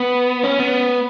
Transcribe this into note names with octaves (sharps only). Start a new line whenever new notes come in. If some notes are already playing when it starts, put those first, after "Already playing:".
Already playing: B3
C#4
B3